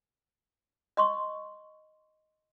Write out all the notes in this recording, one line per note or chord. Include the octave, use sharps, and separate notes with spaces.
D#5 C6 C#6